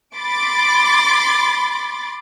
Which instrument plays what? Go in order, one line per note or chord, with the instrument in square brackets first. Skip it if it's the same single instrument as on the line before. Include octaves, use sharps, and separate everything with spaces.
[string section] B5 C6 D6 A6